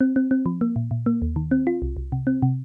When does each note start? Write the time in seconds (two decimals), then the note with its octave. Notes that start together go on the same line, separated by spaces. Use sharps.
0.01 C4
0.16 C4
0.31 C4
0.46 F3
0.61 A#3
0.76 A#2
0.91 A#2
1.06 A#3
1.22 D#2
1.36 D#3
1.51 C4
1.67 F4
1.82 C2
1.97 C2
2.12 C3
2.27 C4
2.42 C3